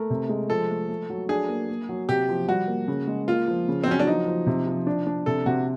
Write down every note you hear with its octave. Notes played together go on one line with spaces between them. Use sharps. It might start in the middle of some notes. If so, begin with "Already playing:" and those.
Already playing: A3 A#4
C3
G#3
F3 A4
A3
A3
F#3
D4 G#4
A#3
A#3
F#3
C3 G4
F3
G3 F#4
A#3
C#3
G#3
A#3 F4
F3
C#3
C4
F#3 C#4
D4
F3 D#4
F3
C3
F3
D4
D4
C3 A4
C3 F#4